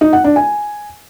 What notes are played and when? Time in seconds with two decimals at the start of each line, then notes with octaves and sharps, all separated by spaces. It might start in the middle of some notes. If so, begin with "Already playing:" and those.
0.01 D#4
0.13 F#5
0.24 D4
0.36 G#5